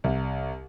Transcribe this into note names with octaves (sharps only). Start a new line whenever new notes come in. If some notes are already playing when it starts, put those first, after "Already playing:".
C2